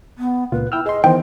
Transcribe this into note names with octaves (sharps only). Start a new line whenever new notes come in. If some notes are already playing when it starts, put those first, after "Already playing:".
B3
C#2 A#2 F4 B4
E4 G5 E6 F6
G#4 D#5 C6
D#3 E3 B3 C5 G5